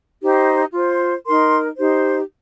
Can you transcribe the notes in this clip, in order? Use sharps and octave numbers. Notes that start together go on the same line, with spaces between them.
D#4 G4 C5
F4 C5
D#4 A#4 C6
D#4 G4 C5